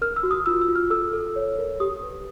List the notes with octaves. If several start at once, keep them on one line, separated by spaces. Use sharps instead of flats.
A#4 F6
E6
F#4
D#6
F4 E6
E6
F4
F6
A4 E6
A4
C#5
A#4
G4 D#6
B4